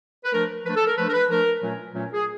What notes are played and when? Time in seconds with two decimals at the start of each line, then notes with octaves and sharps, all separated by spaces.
0.24 B4
0.33 F3 A3 D4 A#4
0.65 F3 A3 D4 B4
0.76 A4
0.86 A#4
0.98 F3 A3 D4 B4
1.08 A#4
1.14 B4
1.29 F3 A3 D4 A#4
1.62 A#2 F#3 A3 C#4
1.93 A#2 F#3 A3 C#4
2.14 G#4